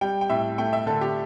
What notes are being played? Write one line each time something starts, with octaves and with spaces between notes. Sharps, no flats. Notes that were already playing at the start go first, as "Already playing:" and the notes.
G3 G5
G5
A2 E5
A3 G5
E5
D3 A4
G4